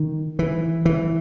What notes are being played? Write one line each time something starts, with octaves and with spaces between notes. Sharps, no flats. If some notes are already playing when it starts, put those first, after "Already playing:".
Already playing: D#3
E3
E3